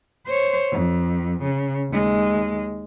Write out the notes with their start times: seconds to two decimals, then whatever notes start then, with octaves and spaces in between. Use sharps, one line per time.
0.27 C5 C#5
0.71 F2
1.43 C#3
1.91 D#2 G#3